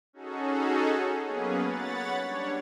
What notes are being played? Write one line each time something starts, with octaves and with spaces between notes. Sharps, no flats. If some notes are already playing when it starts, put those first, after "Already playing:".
C#4 D#4 F#4 G#4 A4
F#3 A#3 B3 C#4 G#4 B4
C#5 F#5 B5 A6
G3 D4 C#5